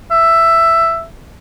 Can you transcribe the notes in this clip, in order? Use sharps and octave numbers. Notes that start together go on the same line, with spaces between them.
E5